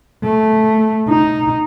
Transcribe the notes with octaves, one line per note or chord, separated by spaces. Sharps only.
A3
D#4